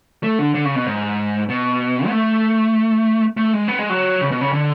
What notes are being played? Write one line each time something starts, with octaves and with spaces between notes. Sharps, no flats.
A3
D3
D3
C#3
B2
G#2
B2
B3
A3
A3
G#3
B3
G#3
F#3
C#3
B2
C#3
D3